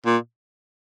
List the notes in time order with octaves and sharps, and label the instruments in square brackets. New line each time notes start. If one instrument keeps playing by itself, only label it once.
[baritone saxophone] A#2